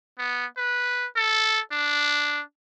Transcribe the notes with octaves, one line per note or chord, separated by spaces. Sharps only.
B3
B4
A4
D4